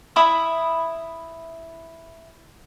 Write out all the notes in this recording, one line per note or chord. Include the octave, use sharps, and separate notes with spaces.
E4 E5 B5 D#6